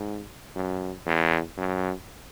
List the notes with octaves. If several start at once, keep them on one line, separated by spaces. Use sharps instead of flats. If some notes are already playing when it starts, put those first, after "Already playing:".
Already playing: G#2
F#2
E2
F#2